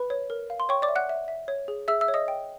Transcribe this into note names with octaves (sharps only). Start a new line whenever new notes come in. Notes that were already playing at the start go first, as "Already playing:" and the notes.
Already playing: B4 B5
C#5
A#4
F5
C6
C#5 G5 C#6
D5 D6
E5
F#5 F#6
E5
E5
C#5
G#4
G#4 E5 E6
E5 E6
C#5
D#5 D#6
G5